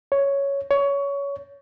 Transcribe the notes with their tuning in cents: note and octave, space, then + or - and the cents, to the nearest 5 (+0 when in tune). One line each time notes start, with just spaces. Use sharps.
C#5 +5
C#5 +20